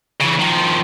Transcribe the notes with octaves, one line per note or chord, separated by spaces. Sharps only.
C#3 E3
D#3 F3